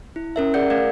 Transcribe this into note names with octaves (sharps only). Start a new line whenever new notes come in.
E4
C#4 A#4 E5
G#4 A#4 D5 F#5 G6 C#7
A3 A#4 F5 G#6